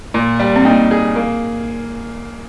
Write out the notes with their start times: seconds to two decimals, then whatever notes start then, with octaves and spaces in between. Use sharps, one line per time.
0.14 A#2
0.40 G3
0.56 C4
0.65 A#3 D#4
0.91 G#4
1.16 A#3